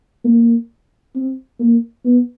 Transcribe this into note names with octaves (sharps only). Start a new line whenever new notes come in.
A#3
C4
A#3
B3